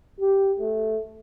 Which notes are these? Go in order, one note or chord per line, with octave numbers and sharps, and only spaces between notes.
G4
A3